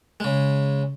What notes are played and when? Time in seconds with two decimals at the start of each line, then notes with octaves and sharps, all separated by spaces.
0.20 C#3 G#3